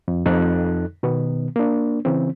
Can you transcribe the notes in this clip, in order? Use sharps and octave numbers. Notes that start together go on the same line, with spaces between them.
F2
F2 D#4 A4 F#6
B2 D#3 B3
A#3 D4
C#3 E3 C4